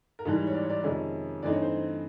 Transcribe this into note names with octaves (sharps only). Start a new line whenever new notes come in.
A#4
G#2 E3 G3 A4
C#5
D5
C#5
D5
F2 C3 D#3 G#3 C#4
G2 E3 A3 C4 D#4 D5
C#5
C5